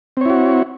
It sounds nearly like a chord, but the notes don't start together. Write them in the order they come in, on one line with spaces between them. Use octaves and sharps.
C4 C#5 E4 F#4